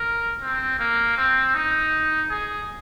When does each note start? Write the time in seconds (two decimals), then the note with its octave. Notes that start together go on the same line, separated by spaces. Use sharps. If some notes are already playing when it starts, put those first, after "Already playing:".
Already playing: A#4
0.41 C4
0.79 A#3
1.17 C4
1.54 D#4
2.30 G#4